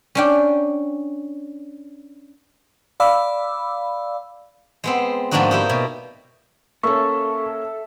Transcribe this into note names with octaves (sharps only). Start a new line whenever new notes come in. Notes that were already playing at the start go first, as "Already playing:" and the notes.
C#4 D4 G5
D5 F5 B5 D6 E6
G#3 B3 C4
G#2 F3 A#3 D4 D#4 F#4
D#4 E4 G4
B2
A#3 C#4 A4 E5 C#6